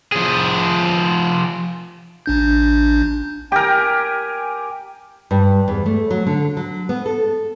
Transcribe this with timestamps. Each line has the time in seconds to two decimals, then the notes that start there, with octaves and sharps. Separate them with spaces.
0.12 F3 G#4
2.26 A1 D4 G6
3.52 G4 A#4 G5 G#5
5.31 G2
5.68 E2
5.86 A3
6.10 F#3
6.27 D3
6.57 F#3
6.89 B3
7.06 A4